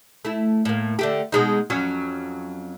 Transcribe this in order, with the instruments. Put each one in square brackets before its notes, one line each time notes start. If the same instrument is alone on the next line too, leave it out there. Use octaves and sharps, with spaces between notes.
[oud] A3 E4
A2 A#3
D3 A3 G4
B2 G#3 D#4
F2 F#3 C#4